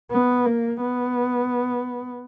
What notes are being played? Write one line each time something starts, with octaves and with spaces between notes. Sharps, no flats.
B3
A#3
B3